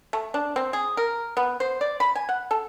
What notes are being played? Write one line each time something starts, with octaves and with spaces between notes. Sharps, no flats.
A3
D4
C4
G#4
A#4
B3
C5
D5
B5
G#5
F#5
A4